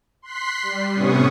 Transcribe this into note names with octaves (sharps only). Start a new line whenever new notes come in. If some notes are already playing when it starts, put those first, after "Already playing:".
C6 F#6 B6 C7
G3
A2 C3 B3 C#4 C#6 D#6